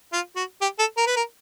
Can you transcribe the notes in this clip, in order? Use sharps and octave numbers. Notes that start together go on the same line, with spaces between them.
F4
F#4
G4
A4
A#4
B4
A#4